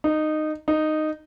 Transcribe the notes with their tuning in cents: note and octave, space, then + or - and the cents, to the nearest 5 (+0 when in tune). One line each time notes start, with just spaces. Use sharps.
D#4 -15
D#4 -10